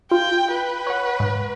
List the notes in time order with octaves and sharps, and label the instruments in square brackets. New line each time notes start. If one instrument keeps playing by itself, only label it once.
[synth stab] F4 [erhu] G5
[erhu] B4
[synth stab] C#5 F#5
G#2